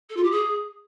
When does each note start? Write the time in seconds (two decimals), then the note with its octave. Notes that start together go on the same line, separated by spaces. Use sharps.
0.09 A4
0.16 F4
0.23 G4
0.30 G#4